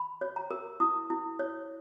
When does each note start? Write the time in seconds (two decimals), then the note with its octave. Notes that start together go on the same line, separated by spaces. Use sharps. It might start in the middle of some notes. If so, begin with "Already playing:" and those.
Already playing: B5
0.21 C#5
0.36 A#5
0.51 A#4
0.80 E4 D#6
1.10 E4
1.39 C#5